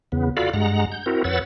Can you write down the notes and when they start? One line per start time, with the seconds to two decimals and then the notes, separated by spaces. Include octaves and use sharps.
0.12 E2 C#3 B3
0.37 F4 F#4 A4 D5 F5 B5
0.53 G2 G#3 F#5 A#5
0.92 G6
1.06 C4 E4 F#4 A#4
1.24 F2 B4 C#5 F#5 E6 A6